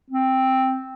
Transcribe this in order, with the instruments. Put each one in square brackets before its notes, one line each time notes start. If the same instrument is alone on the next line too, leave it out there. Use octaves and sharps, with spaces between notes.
[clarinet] C4